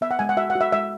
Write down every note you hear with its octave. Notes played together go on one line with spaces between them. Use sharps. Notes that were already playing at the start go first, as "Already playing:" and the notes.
B3 E5
F#5
G#3 G#5
F#5
F#4 E5
F#5
F#4
E5
G#3 E5